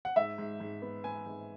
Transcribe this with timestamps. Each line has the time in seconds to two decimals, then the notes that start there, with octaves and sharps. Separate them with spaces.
0.05 F#5
0.16 G#2 E5
0.38 G#2
0.60 G#2
0.82 B3
1.04 B3 G#5
1.26 G#2